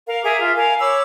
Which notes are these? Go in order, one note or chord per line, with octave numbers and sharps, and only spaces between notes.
A#4 F5
G#4 A#4 E5 D6
F4 E5
A#4 F5 G#5
C#5 B5 D6 E6